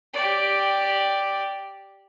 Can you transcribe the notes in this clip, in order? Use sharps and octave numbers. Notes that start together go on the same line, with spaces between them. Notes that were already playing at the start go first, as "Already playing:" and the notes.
G4 D5